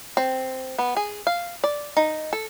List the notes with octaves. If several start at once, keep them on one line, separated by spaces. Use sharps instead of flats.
C4
B3
G#4
F5
D5
D#4
A4